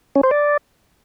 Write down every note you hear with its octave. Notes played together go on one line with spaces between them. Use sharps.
C#4
C5
D5